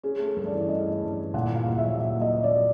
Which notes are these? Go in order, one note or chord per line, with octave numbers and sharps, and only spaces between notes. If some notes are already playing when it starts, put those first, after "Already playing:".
C#4 G#4
A3
A4
G2
D5
E3
C#4 D#5
A3
G2
E3
A#2 F#5
A#3 F5
A#2
E5
F#3
A#2 E5
A#3
D#5
A#2
D5
F#3